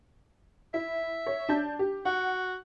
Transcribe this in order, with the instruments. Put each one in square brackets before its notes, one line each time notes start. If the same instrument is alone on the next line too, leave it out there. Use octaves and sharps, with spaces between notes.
[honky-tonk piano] E4 [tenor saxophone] E5
[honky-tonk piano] C#5
D4 A5 G6
G4
[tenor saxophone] F#4 [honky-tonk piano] F#5